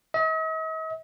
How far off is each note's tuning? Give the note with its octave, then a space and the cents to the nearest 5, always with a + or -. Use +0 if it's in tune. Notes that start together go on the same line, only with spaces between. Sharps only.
D#5 +45